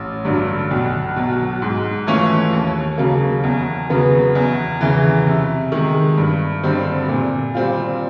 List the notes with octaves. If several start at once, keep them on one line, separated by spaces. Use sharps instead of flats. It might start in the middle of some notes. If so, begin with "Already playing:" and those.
Already playing: A1
G2 D3 F#3
B1
B2 F#3
G#2
E3 A3 C#4 F4
D#2
C#3 F#3 A#3
E2
C#3 F#3 B3
E2
C#3 E3
C3
D#3 G#3
G2
D3 G3 C4
A#2
G3 C4 F4